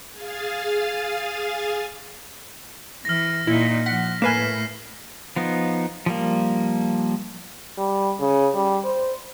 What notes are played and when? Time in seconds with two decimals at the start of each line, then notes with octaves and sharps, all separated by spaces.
0.12 G#4 F5 G#5 A6
3.05 E3 F6 A#6
3.47 A#2 D#4 E4
3.86 F3 F#5 B6
4.22 A2 A3 A#3 B4 G#5 F6 C7 E7
5.36 F3 B3 D#4
6.06 F3 G3 A#3
7.78 G3
8.20 C#3
8.54 G3
8.85 C5